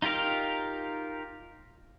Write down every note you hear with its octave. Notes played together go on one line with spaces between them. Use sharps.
D#4 F4 G4 A#4 F5